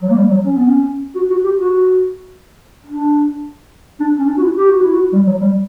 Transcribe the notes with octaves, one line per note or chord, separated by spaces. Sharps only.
F#3
A#3
G3
F#3
C#4
B3
C#4
F#4
F#4
G4
F#4
D4
D4
C#4
D4
F#4
E4
G4
F#4
E4
F#4
G3
F#3
G3